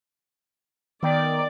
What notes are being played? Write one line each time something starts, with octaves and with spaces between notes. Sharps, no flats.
D#3 B3 D5 G5